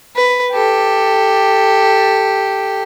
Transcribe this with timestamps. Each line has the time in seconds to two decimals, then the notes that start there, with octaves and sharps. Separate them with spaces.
0.16 B4
0.52 G4 A4